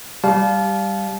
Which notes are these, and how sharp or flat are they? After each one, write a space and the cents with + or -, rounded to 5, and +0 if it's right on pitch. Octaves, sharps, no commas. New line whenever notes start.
G3 +0 F5 +0 A5 -30